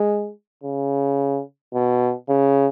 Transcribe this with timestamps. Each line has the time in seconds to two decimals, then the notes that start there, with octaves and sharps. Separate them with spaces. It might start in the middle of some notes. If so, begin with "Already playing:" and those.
Already playing: G#3
0.64 C#3
1.74 B2
2.29 C#3